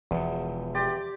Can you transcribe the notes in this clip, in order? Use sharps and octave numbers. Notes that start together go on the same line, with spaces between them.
E1 E2 F3
G4 D5 C6